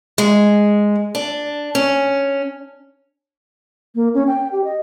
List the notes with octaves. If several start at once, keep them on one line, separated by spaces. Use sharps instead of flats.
G#3
D4
C#4
A#3
C#4
G5
G4
D#5